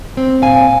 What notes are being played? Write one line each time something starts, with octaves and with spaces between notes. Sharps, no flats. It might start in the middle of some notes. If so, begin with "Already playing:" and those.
C4
A#2 F5 G#5